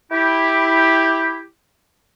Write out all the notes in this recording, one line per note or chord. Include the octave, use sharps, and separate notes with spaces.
E4 G4